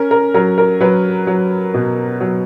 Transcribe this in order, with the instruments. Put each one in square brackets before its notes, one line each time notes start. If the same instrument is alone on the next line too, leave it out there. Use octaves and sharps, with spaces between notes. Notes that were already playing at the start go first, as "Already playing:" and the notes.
Already playing: [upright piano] C#4 A#4
A#4
F#3 A#4
A#4
F#3 B4
F#3
B2
F#3